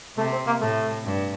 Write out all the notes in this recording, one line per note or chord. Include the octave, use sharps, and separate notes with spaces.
C3 A3
C4
A#3
A2 A3
G2